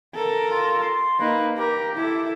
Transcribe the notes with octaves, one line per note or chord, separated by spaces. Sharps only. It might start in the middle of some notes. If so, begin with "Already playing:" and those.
A4 A#4
F4
C6
A#3 D#4 B4
G4 A#4
E4 A4